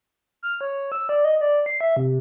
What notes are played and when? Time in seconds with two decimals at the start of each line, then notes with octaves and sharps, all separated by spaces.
0.43 F6
0.61 C#5
0.92 E6
1.09 D5
1.24 D#5
1.41 D5
1.66 C7
1.81 E5
1.96 C3